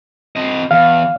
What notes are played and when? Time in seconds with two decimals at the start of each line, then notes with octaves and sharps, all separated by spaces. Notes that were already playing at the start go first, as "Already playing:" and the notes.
0.36 C4 D#5
0.71 E2 F5